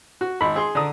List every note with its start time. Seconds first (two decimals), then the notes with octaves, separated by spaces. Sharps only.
0.21 F#4
0.41 G#1 B5
0.56 G#4 C6
0.75 D3 D5 A#5 D#6